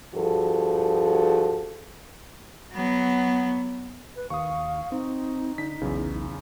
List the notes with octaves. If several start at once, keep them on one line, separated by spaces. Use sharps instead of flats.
G2 F3 F#4 G#4 A4
F#3 B3
B4
D#2 F5 C#6 D#6
C4 D#4
D3 B6
B1 E2 C#3